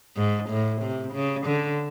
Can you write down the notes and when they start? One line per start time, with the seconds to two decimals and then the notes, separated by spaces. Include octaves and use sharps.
0.17 G#2
0.49 A2
0.82 C3
1.14 C#3
1.46 D3